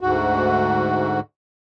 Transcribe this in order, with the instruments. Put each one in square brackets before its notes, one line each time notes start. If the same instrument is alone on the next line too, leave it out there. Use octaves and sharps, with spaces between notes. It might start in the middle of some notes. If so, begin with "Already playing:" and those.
[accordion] D2 G#2 F#4